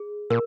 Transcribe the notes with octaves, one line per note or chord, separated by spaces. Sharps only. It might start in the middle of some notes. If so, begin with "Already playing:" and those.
Already playing: G#4
A#2 A#4